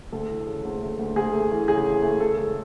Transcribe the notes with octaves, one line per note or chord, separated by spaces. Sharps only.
D2 A4
E3
C#3
D2
A3
D2
D2 G#4
A3
E3
C#3 G#4
E3
A3
C#3 A4
C#2 A4